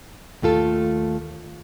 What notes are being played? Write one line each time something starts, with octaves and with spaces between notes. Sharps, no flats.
D#2 A3 F4 A4